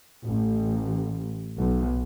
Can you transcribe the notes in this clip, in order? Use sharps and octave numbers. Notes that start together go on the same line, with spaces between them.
A1
B1